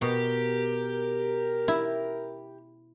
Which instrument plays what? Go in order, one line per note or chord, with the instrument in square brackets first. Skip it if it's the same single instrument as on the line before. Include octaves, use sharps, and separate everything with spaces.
[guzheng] B2 [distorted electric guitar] G4 [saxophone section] A#4
[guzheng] E4